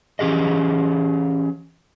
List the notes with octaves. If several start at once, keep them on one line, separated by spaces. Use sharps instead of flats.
E3 C#4 G4 G#4 D#5